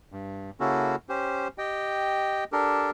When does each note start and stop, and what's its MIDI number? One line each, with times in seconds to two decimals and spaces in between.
0.12 0.50 43
0.60 0.96 49
0.60 0.96 58
0.60 0.96 61
0.60 0.96 64
0.60 0.96 66
0.60 0.96 69
1.09 1.48 61
1.09 1.48 67
1.09 1.48 72
1.58 2.44 67
1.58 2.44 75
1.58 2.44 79
2.52 2.91 62
2.52 2.91 67
2.52 2.91 69
2.52 2.91 70